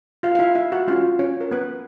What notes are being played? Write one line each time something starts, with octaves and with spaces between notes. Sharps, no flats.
F4 F5
F5
E4 E5
E4 E5
F#4 F#5
G#3 C#4 F4 F#4 F5
C#4 C#5
A#4
B3 B4